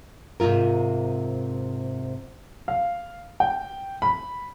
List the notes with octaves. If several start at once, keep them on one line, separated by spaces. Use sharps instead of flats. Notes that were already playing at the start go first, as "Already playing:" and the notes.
G#2 C3 D#3 F4 A#4
F5
G5
B5